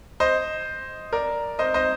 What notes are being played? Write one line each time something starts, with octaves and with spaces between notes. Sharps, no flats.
C5 D#5
A#4 D5
C5 D#5
C5 D#5